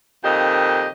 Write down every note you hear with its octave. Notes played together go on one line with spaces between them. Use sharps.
F2 A#2 D#3 G4 D#5